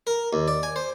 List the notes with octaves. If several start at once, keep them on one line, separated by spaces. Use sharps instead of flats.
A#4
D#2
D5
G#5
C5